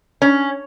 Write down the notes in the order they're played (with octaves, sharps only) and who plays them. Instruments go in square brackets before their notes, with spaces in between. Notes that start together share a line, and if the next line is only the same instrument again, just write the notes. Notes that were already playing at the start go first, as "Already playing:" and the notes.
[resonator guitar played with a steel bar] C#4